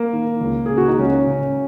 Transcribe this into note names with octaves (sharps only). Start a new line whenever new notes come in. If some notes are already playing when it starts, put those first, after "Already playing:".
Already playing: A#3
D#3
C#2
C#3 G#4
F#4
D#4
C#2 C#4
C#3